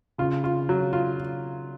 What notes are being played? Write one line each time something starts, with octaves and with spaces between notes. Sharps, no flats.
C#3 C#4 F4
F4
F#3
F4